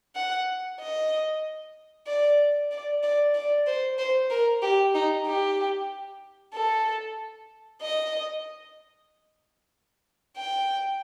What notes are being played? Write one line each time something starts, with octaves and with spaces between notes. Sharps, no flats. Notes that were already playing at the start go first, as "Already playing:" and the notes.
F#5
D#5
D5
D5
D5
D5
C5
C5
A#4
G4
D#4
G4
A4
D#5
G5